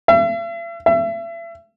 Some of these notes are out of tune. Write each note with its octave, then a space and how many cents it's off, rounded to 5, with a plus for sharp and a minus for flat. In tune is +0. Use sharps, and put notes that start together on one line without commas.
E5 +45
E5 +35